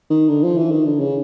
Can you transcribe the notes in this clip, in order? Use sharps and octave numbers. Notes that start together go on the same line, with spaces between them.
D#3
D3
F3
E3
D#3
D3
C#3